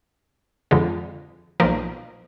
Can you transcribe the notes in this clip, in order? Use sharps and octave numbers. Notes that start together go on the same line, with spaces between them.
F2 D3 G#3
B1 A#2 F3 A#4